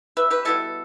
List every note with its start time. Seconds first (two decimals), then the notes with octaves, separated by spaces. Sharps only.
0.17 B4 E5
0.30 G4 B4
0.45 B2 G3 B3 E4 A4